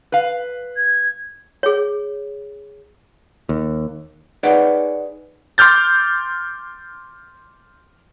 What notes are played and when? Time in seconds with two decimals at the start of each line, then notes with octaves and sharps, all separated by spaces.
0.12 B4 F5
0.77 G#6
1.63 G#4 C#5
3.49 D#2
4.43 D#4 G#4 B4 C#5 D5 F#5
5.58 C6 D6 F6 G6 A6